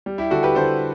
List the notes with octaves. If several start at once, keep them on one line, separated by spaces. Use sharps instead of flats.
G3
E4 G4
D3 F#4 A4
G4 B4
D3 A4 C5